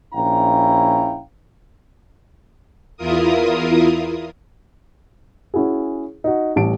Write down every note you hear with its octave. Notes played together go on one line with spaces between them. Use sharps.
A#1 C#4 E4 F5 G5 A#5
E2 E4 F4 A#4 D#6
C#4 E4 F#4 G#4
D#4 F#4
A1 A2 G3 A5 D7